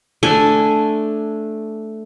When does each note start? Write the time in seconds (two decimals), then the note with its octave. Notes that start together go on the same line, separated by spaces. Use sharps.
0.23 A3 D4 G#5